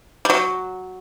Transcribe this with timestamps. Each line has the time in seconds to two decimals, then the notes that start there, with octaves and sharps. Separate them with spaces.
0.25 G3
0.30 F#3